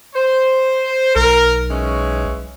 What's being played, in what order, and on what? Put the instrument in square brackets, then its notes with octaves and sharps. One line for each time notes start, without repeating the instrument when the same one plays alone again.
[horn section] C5
[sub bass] B1 [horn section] A#4
[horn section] E3 G#3 C#4